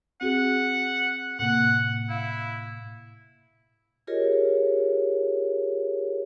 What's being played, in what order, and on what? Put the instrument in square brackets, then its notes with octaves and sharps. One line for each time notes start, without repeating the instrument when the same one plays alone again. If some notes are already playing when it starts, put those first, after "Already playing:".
[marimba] C4 F#4 G#4 [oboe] F#5
[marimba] A2 C3 A#3 [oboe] F#5
[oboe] E4 [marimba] F5
[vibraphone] F4 G4 G#4 A#4 C#5 D#5